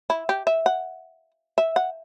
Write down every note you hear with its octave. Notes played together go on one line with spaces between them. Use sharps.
E4
G4
E5
F#5
E5
F#5